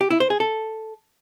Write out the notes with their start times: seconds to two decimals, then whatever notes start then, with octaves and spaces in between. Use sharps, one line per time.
0.01 G4
0.10 E4
0.20 C5
0.30 G#4
0.40 A4